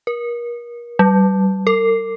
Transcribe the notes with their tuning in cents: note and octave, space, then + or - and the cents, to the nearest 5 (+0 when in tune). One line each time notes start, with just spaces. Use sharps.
A#4 +35
G3 -35
A#4 -40